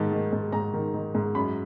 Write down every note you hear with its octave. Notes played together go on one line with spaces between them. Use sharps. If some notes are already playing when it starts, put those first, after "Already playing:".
Already playing: G#2 D#3 A5
D#3
G#2
G#2 A#5
D#3
D#3
G#2
F#2 B5